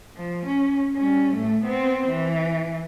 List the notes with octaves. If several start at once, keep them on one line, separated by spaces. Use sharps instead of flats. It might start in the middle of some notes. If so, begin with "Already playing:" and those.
F3
C#4
G3 C#4
A2 A3
B3 C4
E3